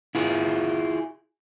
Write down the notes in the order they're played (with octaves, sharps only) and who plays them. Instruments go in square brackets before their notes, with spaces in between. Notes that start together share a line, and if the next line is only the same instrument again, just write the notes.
[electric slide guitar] E4 F4 G#4